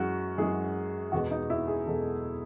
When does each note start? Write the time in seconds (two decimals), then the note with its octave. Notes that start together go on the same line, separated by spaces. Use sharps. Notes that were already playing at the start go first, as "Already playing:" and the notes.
Already playing: F#2 E3 G#3 F#4
0.38 F#2 E3 G#3 G#4
1.12 E2 B2 G#3 B3 F#4
1.31 D#4
1.50 E4
1.68 G#4
1.87 E2 B2 G#3 B3 A4